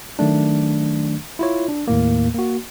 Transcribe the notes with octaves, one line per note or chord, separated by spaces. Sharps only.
D#3 F#3 A3 D4
E4 F4 C#5
D4
D#2 A2 A#3
A#3 F#4